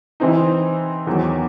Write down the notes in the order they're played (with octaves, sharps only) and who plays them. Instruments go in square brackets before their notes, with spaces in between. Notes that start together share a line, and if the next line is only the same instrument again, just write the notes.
[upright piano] E3 C4 D#4
E2 D#3 F#3